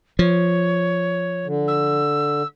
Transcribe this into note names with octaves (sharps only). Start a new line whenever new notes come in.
F3 C#5
D3
E6